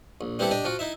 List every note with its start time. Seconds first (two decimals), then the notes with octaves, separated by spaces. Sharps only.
0.21 A#1
0.39 G3 B3 C4 E4 G4 A4
0.51 D4 G4 D#5
0.65 F3 F4 F#4
0.79 D#4 E4 E5